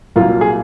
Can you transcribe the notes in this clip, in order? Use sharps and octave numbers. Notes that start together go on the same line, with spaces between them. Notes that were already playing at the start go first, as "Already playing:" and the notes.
C2 A#2 F#3 A#3 F4
G#4